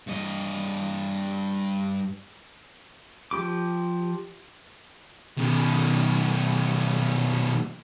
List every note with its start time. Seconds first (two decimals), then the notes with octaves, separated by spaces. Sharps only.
0.07 G2 D#5
3.31 F3 G4 D6
5.38 B2 D#3